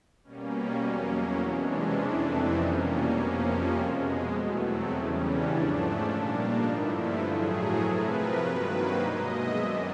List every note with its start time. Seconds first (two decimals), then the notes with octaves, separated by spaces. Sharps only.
0.23 B2 G3 A#3 C#4
0.82 E2 B2 F#3 A#3 C#4
1.11 C#4
1.40 C3 E3 G#3 D4
1.69 C#4
1.99 F2 C3 E3 A3 D4
2.28 D#4
2.56 B2 G3 A#3 C#4
3.15 F2 C3 F3 A#3 C#4
3.74 B2 G#3
4.32 E2 B2 F#3 A3
4.61 C4
4.90 E2 C#3 E3 G3 C#4
5.19 D4
5.49 G#2 F3 A3
5.78 C#4
6.07 A#2 G3 A#3 D4
6.36 D#4
6.65 G2 D3 F3 A3 E4
6.94 F4
7.23 A2 F#3 A3 G#4
7.53 A#4
7.82 C3 F3 A3 B4
8.11 A#4
8.40 G2 D#3 F#3 A#3 B4
8.69 C5
8.99 B2 G#3 D#5
9.28 E5
9.57 F#2 D#3 F#3 D5